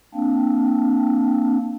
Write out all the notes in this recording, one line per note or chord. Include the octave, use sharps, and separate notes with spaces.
A#3 C4 D4